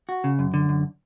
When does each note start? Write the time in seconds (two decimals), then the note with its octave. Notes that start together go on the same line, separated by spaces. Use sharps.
0.09 F#4
0.24 C#3
0.39 F#2
0.54 D3
0.69 F#2